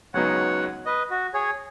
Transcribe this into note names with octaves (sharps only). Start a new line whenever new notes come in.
C#2 C#3 F#3 B3 D#4 C#5 F#5
B4 D#5
F#4
G#4 C#5